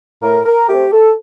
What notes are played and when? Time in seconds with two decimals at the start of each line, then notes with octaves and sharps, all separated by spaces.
0.22 A2 A#4
0.45 A#4
0.68 A3 C4 G4
0.91 A4